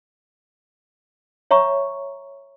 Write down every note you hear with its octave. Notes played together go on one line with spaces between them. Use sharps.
C#5 E5 A#5 C#6